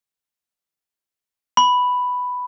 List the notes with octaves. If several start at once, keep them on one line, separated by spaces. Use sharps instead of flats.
B5